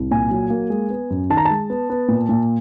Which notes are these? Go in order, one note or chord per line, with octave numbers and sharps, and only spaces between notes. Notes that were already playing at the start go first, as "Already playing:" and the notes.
Already playing: C2
A#2 G#5
F#3
A#3
G#3
B3
F#2
D#3 A5
A#5
G#3 A5
B3
B3
A#2
A#2